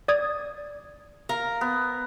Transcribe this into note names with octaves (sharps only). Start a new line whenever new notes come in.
D5 D#6 G#6
A#4 F5
B3